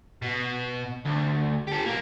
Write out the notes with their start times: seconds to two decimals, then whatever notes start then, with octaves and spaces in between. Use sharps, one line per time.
0.22 B2
1.05 D2
1.68 G4 A4
1.86 B1 A#3